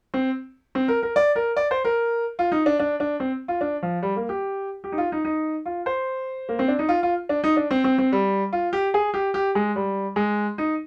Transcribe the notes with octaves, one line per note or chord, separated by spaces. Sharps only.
C4
C4
A#4
A#4
D5
A#4
D5
C5
A#4
F4
D#4
D4
D4
D4
C4
F4
D4
F3
G3
A#3
G4
G4
D#4
F4
D#4
D#4
F4
C5
A#3
C4
D4
D#4
F4
F4
D4
D#4
D4
C4
C4
C4
G3
F4
G4
G#4
G4
G4
G#3
G3
G#3
D#4